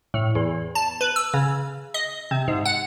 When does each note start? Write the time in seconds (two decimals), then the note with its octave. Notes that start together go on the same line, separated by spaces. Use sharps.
0.14 A2
0.35 E2
0.75 A5
1.01 B4
1.16 E6
1.34 C#3
1.94 D#5
2.31 C3
2.48 G#2
2.65 F#5